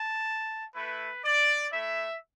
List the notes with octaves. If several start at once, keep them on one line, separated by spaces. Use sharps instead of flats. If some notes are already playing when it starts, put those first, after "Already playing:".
Already playing: A5
A3 E4 B4
D5
A3 E4 E5